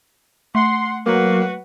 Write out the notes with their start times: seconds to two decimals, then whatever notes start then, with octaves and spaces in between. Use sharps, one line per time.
0.55 A3 F#5 C6
1.06 F#3 A#3 F#4 B4